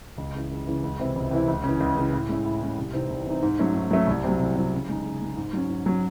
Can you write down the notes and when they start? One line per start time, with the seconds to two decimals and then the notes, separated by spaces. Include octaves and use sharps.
0.18 C#2
0.34 C#3 E3
0.51 C#2
0.67 C#3 E3
0.83 C#2
0.99 C3 E3 C4 E4
1.16 C#2
1.31 C3 E3 C4 E4
1.48 C#2
1.64 C#3 E3
1.80 C#2
1.96 C#3 E3
2.13 A2
2.29 G#3 C#4 E4
2.45 A2
2.61 G#3 C#4 E4
2.78 C2
2.93 C3 E3 C4 D#4
3.10 C2
3.27 C3 E3 C4 D#4
3.42 G#2
3.59 F#3 A3 C#4
3.75 G#2
3.91 F#3 A3 C#4
4.07 C2
4.24 C3 F#3
4.40 C2
4.56 C3 F#3
4.72 C#3
4.89 G#3 D#4
5.05 C#3
5.21 G#3 D#4
5.37 G#2
5.53 F#3 C#4
5.70 G#2
5.86 F#3 C#4